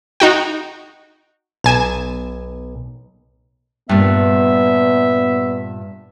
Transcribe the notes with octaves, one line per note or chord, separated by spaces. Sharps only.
D#4 F#4 G5
B1 G#5 E7
G2 A#2 B3 E5